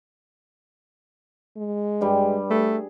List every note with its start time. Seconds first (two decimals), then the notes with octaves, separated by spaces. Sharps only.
1.57 G#3
2.01 G2 G3
2.51 A3 G#4